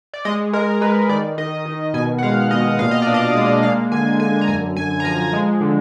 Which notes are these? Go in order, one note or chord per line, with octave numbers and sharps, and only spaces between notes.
D5
G#3 D#5
G#3 A#4
G#3 B4
D#3 D5
D#3 D#5
D#3
B2 G#5
F#5
G#3 F5
B2 D#5
A#2 F5
D#5
D4 D5
D#5
G#3
A#3 F5
D3 G#5
D3 G#5
A#5
F#2 G#5
F#2 G#5
A#5
F3 G#5
G#3
D3